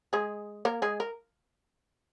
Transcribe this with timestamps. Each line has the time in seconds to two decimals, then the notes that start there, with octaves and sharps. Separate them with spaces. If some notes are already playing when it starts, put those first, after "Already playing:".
0.13 G#3 G#4
0.65 A#3 A#4
0.82 G#3 G#4
1.00 A#4